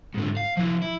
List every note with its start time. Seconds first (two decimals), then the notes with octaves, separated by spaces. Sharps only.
0.14 G#2 D3
0.37 F5
0.57 F3 E4
0.82 E4